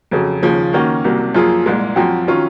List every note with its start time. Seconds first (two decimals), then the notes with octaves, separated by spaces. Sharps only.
0.11 F2 C#3 F#3
0.42 D#2 C#3 F3
0.73 D#3 A#3 C#4 F#4
1.04 C2 C3 F#3 A#3
1.35 F#2 F3 A#3 F4 G#4
1.66 C2 A#2 G#3
1.96 F#2 F3 C4 F#4
2.27 D#3 F#3 C#4 F4